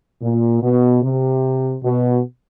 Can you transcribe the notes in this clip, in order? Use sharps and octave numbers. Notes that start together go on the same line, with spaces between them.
A#2
B2
C3
B2